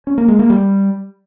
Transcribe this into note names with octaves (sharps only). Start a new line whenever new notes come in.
C#4
A#3
G#3
A#3
G3